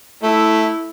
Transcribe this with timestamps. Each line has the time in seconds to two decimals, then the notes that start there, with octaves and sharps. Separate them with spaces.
0.23 A3 E4